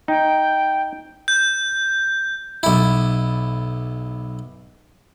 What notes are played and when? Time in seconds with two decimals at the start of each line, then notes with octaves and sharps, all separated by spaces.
0.08 D#4 G5
1.28 G6
2.63 B1 E4